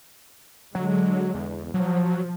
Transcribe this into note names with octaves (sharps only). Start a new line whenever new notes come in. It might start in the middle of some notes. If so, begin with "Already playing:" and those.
D3 F#3 G#3
E2
F3 F#3